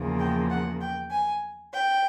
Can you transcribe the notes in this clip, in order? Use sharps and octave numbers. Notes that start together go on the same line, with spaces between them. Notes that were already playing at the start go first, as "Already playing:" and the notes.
Already playing: E2 C#3 F3 A#3
G5
F#5
G5
G#5
G5